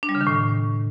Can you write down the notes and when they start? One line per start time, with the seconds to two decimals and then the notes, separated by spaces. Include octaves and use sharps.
0.03 D4
0.09 G3
0.15 C#3
0.21 D#3
0.27 A2